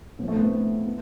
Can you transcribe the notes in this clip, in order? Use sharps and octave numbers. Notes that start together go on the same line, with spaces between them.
A2 F3 B3
A3
B3
A3 C4
B3